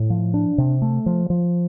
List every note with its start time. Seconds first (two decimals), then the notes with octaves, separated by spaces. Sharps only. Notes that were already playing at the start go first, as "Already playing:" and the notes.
Already playing: A2
0.10 F3
0.34 D4
0.58 C3
0.82 A3
1.06 F3
1.30 F3